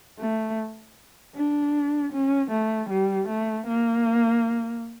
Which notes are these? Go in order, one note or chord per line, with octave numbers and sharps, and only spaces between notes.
A3
D4
C#4
A3
G3
A3
A#3